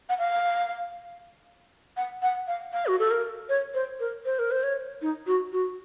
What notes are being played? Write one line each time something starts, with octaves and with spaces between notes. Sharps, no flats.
F#5
F5
F#5
F#5
F5
F5
F#4
A4
A#4
C#5
C5
A#4
C5
A#4
C5
C#5
D#4
F#4
F#4